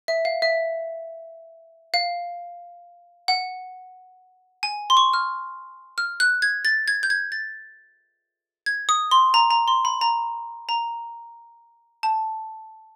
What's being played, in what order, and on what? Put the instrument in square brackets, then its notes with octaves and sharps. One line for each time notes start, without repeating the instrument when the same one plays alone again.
[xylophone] E5
F5
E5
F5
F#5
G#5
C6
C#6
F6
F6
F#6
G#6
A6
G#6
G6
G#6
A6
G#6
D#6
C6
A#5
A#5
C6
B5
A#5
A#5
A5